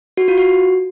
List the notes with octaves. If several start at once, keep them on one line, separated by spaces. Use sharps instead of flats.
F#4
F4
F#4